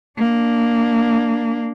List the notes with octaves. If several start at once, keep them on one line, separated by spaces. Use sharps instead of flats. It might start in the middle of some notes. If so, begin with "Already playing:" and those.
A#3 D4